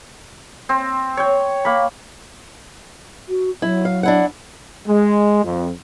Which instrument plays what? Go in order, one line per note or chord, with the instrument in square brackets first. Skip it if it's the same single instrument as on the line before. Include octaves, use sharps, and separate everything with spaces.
[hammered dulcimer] C4
C#5 G5
A#3 B5
[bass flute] F#4
[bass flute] F#3 [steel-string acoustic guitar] E4
[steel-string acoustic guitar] F5
D4 E4 F#5
[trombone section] G#3
F2